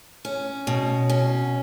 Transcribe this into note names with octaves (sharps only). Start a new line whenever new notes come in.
C#4
B2
C#4